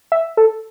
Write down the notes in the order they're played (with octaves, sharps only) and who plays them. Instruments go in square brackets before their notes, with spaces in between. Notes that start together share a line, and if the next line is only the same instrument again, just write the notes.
[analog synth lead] E5
A4